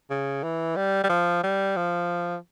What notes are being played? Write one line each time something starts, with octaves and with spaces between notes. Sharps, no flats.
C#3
E3
G3
G3
F3
G3
F3